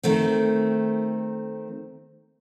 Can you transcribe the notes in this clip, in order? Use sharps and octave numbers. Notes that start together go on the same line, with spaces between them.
D#3 A3 C4